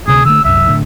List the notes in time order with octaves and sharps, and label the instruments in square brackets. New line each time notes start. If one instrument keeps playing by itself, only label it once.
[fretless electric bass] D2 C3 [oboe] G#4
[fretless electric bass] D3 A3 [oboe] E6
[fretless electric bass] C2 F#2 [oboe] E5
[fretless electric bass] A2 D3